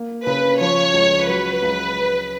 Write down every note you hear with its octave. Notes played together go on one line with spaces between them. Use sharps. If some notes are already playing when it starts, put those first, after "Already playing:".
Already playing: A#3
C#3 B4
F3 C#5
C#2
F#3 B4
C#2